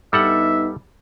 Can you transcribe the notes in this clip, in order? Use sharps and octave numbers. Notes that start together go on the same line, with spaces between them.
G2 G3 B3 D#4 A4 E5 F#5